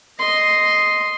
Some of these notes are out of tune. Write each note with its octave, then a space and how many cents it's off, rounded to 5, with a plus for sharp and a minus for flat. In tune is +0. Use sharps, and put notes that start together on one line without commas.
D#5 +0 C6 +0